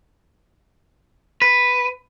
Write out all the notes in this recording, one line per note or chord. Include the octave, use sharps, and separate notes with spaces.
B4